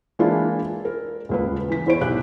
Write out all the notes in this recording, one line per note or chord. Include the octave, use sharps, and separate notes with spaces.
E3 G#3 A#3 D4 E4 F4
A#4
D#1 C#2 B4
E3 B6
E2 E4 C5 C#5 D7
B1 G4 F#6